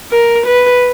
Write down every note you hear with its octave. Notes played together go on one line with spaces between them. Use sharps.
A#4
B4